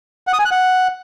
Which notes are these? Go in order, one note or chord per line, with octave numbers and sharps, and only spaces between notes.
F#5
D#6
G#5
F#6
F#5